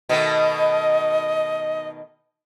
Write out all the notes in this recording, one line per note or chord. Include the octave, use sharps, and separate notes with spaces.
B2 D#3 A3 D#5